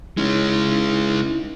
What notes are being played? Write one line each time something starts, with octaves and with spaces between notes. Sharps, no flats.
G#3 C#4 D#4 E4